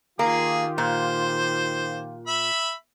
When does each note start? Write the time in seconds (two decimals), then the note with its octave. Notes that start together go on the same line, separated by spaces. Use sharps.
0.19 D#3 A#3 F4 G4 G#4
0.78 A#2 C5
2.27 E5 B5